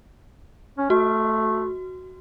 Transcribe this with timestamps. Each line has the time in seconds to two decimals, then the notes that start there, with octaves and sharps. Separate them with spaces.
0.78 C#4
0.90 A3 F#4